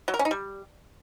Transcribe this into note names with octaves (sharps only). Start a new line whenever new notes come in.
F#3
A#4
C#4
D#4
G3